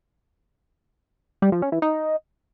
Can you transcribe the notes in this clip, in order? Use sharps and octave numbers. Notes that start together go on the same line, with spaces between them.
G3
F3
C#4
E3
D#4